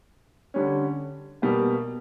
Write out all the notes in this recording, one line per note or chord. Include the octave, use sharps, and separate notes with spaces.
D3 G3 C#4
B2 G3 A#3